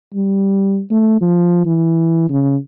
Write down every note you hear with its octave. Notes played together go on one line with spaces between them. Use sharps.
G3
A3
F3
E3
C#3